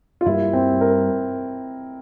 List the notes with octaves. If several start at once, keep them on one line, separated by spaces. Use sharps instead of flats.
F4
G2 G3 A#3 E4
C4
A#4